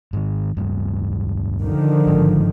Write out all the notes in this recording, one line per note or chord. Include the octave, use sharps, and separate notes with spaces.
G#2 D#3
D1 G2
D3 D#3 F3
G1 G#2